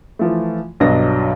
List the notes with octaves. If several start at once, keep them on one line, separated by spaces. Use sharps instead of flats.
E3 F3 A3
B1 G2 F#3 D4 D#5 A#6